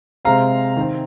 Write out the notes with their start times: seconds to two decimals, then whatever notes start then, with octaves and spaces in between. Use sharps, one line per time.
0.25 C3 G#3 C4 F5 A#5
0.77 D#3 C4